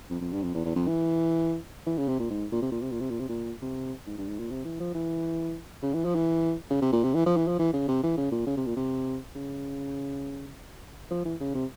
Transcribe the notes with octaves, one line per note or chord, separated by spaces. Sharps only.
F2
F2
G2
F2
E2
E2
F2
E3
E3
C#3
C3
A#2
G#2
A#2
C3
A#2
C3
A#2
C3
A#2
C3
A#2
C3
G#2
G2
G#2
A#2
C3
E3
F3
E3
C#3
E3
F3
E3
C#3
C3
A#2
C3
E3
F3
E3
F3
E3
C#3
C3
E3
C#3
A#2
C#3
C3
A#2
C3
C#3
F3
E3
C#3
C3